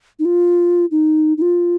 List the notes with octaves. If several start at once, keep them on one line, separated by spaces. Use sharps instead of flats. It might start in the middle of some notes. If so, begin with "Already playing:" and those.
D#4
F4
D#4
D#4
F4